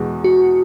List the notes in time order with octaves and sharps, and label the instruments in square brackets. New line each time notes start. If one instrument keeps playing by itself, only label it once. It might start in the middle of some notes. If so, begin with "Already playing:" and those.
Already playing: [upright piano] E2 B2 G#3
[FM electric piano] F#4